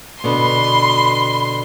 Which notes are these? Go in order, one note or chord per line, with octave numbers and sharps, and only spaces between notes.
B2 D3 B5 C6